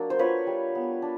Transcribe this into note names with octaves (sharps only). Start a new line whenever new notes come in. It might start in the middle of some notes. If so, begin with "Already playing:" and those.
Already playing: F#3 A#3 D4
C5
F4 B4 C#5
G3
B3
D4